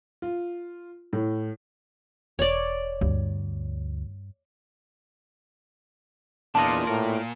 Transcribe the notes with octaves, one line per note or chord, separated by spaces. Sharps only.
F4
A2
E1 C#5 D5
D2 G2
E2 A#2 D4 F4 D#5 A5
A2 A#4